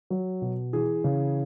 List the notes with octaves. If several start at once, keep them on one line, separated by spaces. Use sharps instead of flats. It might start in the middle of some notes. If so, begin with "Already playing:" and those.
F#3
B2
E3 G#4
C#3